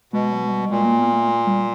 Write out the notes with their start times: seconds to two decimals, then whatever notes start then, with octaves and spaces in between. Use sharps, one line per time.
0.13 B2 G#3
0.32 F#3
0.45 G#3
0.51 G3
0.70 A#2 G#3
0.85 A#3
0.99 B3
1.13 A3
1.47 G3